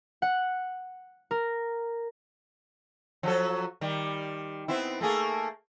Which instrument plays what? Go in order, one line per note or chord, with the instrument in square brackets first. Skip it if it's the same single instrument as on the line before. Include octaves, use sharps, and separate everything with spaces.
[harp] F#5
A#4
[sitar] F3 F#3 A4
D#3 G3
B3 C4 E4
A3 A#3 G#4